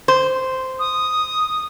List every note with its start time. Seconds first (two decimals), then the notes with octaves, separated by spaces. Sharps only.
0.08 C5
0.79 D#6